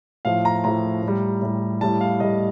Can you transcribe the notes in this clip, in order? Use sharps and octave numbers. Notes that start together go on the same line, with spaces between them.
A2 F3 F5
A#5
A2 F3 A#5
A2
G3
A2 G3
A2 G3 A5
F5
A2 G3 D#5